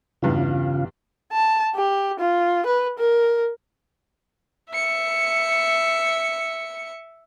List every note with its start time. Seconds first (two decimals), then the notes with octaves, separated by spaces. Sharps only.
0.22 E2 G2 C#3 E3 F4
1.32 A5
1.75 G4
2.19 F4
2.66 B4
2.98 A#4
4.72 E5 C#7